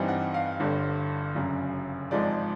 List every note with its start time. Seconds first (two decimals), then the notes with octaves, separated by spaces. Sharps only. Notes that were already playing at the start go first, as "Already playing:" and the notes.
Already playing: G2 E3 G3 C4 D#4 G#5
0.08 F#5
0.34 F5
0.60 G1 G2 D3
1.35 F#1 F#2 C#3
2.11 G#1 G#2 F3 G#3 D5